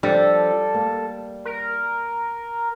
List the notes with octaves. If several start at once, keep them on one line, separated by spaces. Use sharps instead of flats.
F3 G3 D4 A4
A#3
A#4